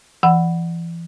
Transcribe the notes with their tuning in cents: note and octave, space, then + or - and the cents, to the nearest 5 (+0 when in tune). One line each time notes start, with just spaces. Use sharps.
E3 +35 F#5 +0 B5 +0